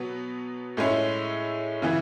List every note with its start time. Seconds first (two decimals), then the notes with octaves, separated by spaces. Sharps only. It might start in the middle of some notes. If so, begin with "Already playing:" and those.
Already playing: B2 F#3 B3
0.77 A2 G#3 C#4 E4
1.82 C#3 E3 B3 E4